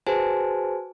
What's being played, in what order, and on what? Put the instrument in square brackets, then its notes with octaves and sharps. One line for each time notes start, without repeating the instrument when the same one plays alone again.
[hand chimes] F#4 G#4 B4 C5 G#5 A5